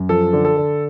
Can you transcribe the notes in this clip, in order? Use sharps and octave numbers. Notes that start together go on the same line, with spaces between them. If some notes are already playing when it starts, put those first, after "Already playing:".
Already playing: F#2
F3 A4
D3
A4
D3